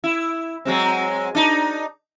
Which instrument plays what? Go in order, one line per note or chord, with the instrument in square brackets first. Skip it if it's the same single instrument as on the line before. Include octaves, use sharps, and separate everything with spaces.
[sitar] E4
F#3 G#3 C4
D4 D#4